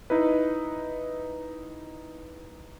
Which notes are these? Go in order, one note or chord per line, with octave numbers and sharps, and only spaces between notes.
D#4 E4 B4